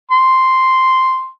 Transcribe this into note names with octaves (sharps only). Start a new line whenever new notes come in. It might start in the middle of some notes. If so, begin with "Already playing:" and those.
C6